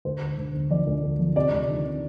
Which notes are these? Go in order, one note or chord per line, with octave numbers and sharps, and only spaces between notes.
D2 C5
D2
D2
D3
F3 D5
D2
D3
F3
C3 D5
D2
D#3
C3